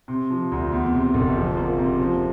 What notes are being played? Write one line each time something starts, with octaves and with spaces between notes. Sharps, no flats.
C3
F3
D2
E2
C3
F#1
F3
A#3
C3
F3